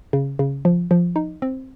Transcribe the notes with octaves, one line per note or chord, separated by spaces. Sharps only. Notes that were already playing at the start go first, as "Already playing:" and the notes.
C#3
C#3
F3
F3
D#4
C4